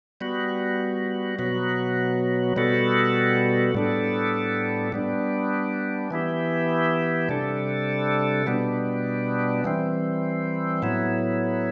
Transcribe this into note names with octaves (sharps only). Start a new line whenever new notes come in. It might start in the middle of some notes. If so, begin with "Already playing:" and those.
G3 B3 F#4
B2 F#3 B3 F#4
B2 G3 B3 F#4 A4
A2 G3 B3 D4 A4
G3 B3 D4
E3 B3 E4 G4
C3 G3 D4 A4
B2 G3 B3 D4
E3 G3 C4
A2 F#3 B3 E4